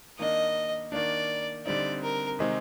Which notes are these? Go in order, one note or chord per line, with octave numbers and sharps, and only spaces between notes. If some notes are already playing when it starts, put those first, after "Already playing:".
D#3 A#3 D4 D#5
D#3 A#3 D4 D5
D3 G3 C4 D#4 D5
A#4
C3 D#3 G#3 C4 D#4